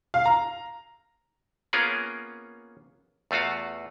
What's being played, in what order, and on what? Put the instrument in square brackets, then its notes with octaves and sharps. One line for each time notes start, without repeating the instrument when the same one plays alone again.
[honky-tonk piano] F5
A#5
[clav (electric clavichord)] A#3 B3 C#4 F4 G#4 A#4
E2 A3 F4 F#4 F5